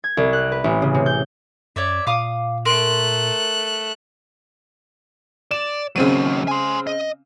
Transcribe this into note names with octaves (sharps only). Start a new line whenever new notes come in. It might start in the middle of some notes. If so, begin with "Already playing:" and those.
G#6
C2
F#6
B4
A1
C#3
C3
G6
F#2 C#5 D5 E5
A#2 F5 D6 D#6
A3 A#4 C6 F#6
D5 E7
D#2 C#3 F#3 C4 D#7
G#5 C6
D#5